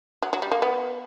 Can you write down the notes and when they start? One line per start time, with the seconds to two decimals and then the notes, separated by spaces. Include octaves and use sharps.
0.22 F#3
0.33 F#3
0.42 G3
0.52 A#3
0.62 B3